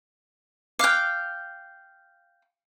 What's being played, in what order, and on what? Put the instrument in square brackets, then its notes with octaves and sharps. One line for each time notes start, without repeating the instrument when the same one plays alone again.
[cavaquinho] F5 G5 [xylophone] D6 F6 F#6